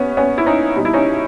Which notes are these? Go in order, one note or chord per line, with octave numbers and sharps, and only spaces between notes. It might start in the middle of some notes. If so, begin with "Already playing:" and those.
Already playing: A#2 G3 B3 C#4
B3 C#4
E4
C#4 D#4
B2 G3 D#4
E4
C#4 D#4